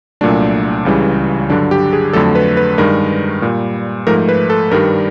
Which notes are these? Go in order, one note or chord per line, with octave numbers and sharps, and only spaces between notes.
C2 A#2 F#3 A3 D4
C#2 C#3 E3 G3
G2 D3 F#3 D4
G4
G#4
F2 D3 F#3 A3 A4
B4
B4
G2 D#3 G#3 A#4
A#2 G3
G#2 F3 A3 A#4
B4
A4
G2 D#3 G3 A#4